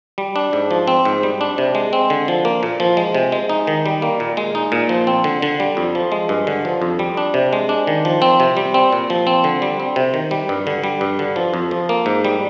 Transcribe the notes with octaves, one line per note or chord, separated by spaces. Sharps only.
G3
D4
G#2
F3
C4
G#2
G3
D4
C3
G#3
C4
D3
F3
A#3
A#2
F3
G#3
C3
G#3
D#4
D#3
G3
A#3
A#2
G#3
D#4
A#2
F3
C4
D3
D3
G3
F2
F3
G#3
G2
D3
F3
F2
G3
D4
C3
G#3
D4
D#3
F3
C4
C3
G3
C4
A#2
F3
C4
D3
G3
C4
C3
D#3
G3
G2
D3
G3
G2
D3
F3
F2
F3
A#3
G#2
G3